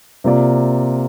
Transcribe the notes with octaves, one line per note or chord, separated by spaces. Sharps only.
C3 A#3 F4 D5